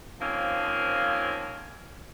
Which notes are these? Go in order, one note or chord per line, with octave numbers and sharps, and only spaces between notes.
D#3 F3 A#3 C4 C#4